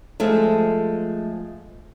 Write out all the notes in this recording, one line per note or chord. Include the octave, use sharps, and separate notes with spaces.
F3 G#3 A3